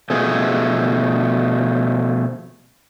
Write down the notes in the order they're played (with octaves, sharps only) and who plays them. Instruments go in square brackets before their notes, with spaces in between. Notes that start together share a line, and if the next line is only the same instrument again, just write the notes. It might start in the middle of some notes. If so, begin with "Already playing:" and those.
[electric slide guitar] B2 F3 A3 G#4